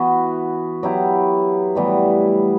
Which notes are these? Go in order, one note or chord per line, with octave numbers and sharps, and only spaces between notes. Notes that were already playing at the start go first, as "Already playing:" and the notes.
Already playing: E3 B3 F#4
F#3 B3 E4 G4
A2 E3 G3 B3